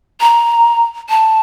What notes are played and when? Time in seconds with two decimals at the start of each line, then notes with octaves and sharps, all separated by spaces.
0.21 A#5
1.10 A5